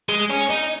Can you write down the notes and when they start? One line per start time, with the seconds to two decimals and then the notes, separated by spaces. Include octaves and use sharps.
0.09 G#3
0.30 C#4
0.50 D#4